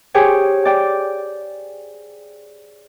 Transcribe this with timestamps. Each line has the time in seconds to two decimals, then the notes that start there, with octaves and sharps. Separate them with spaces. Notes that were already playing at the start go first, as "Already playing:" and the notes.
0.14 G4 G#4 C5 C#5 G5 G#5
0.65 D5 G5